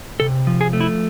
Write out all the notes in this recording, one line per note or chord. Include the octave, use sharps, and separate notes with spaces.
C3 A4
F3
G#4
A3
E4